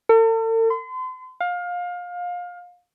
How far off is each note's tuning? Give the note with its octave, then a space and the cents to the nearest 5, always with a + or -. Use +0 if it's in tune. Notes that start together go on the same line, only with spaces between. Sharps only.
A4 +45
C6 -40
F5 +25